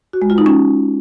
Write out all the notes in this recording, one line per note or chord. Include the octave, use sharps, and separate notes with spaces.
F#4
G#3
F4
D#4
C#4